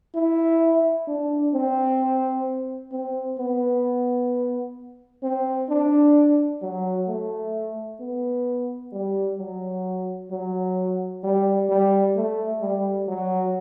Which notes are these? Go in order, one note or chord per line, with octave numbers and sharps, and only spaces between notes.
E4
D4
C4
C4
B3
C4
D4
F#3
A3
B3
G3
F#3
F#3
G3
G3
A3
G3
F#3